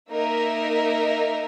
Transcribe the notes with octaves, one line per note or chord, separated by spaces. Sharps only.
A#3 D#4 A#4 E5